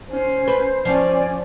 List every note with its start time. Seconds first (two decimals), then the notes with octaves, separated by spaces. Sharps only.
0.10 C#4 C5
0.48 B4
0.85 F3 C#4 D5